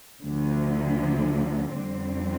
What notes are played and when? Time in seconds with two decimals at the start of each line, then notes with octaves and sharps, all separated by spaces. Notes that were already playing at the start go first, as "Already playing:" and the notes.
0.22 D2 D3 F3
1.72 F2 D3 G3 C4